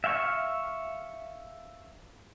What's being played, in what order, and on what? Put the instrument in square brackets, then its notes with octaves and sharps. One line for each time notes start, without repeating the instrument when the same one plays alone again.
[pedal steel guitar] E5 F5 G5 C#6 F6